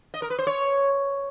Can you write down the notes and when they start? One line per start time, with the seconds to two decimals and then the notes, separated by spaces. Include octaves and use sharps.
0.14 D#5
0.22 A#4
0.30 B4
0.38 C5
0.47 C#5